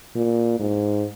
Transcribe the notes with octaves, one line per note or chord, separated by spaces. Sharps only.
A#2
G#2